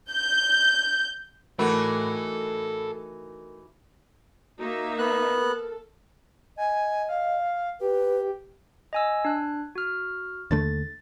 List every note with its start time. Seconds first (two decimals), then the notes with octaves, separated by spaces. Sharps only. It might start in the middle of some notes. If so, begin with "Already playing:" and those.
0.12 G6
1.59 E3 A3 D#4 F#4 A4 A#4 B5
4.58 A#3 D#4 F#4 E5
4.99 B3 A#4 F#6
5.41 A4
6.57 D#5 G#5
7.09 F5
7.81 G4 B4
8.93 D#5 G#5 E6
9.25 D4 F#6
9.75 F#4 F6
10.51 D#2 D3 A3 A6